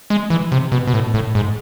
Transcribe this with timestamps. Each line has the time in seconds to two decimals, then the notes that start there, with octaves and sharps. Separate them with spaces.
0.10 G#3
0.30 E3
0.52 C3
0.72 B2
0.87 B2
0.93 A2
1.14 A2
1.35 G#2